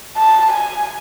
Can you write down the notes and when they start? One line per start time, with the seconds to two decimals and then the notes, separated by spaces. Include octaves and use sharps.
0.17 A5
0.52 G#5